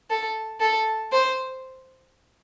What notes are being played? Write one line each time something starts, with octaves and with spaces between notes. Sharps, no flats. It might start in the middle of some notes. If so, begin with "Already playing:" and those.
A4
A4
C5